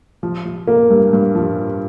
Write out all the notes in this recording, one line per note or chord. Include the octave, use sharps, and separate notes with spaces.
F3
F3
A#3
G2
G2
F3